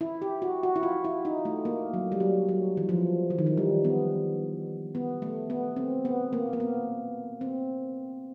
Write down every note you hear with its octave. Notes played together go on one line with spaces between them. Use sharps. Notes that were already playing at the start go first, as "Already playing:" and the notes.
E4
G4
F#4
F#4
E4
F4
E4
D#4
A3
A#3
F#3
G3
F#3
F#3
E3
F3
E3
D#3
E3
G3
B3
B3
A3
B3
C4
B3
A#3
A#3
B3
C4